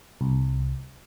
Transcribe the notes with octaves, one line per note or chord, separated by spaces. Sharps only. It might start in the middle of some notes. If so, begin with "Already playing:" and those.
C2